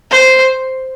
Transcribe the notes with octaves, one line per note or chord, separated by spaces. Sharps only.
C5